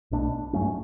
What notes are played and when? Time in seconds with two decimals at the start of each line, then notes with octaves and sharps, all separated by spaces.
0.11 B1 B2 A3 D4
0.53 G2 F#3 A3 C#4